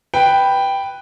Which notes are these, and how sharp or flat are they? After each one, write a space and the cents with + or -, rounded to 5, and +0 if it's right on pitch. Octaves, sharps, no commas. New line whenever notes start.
B4 +0 G5 +0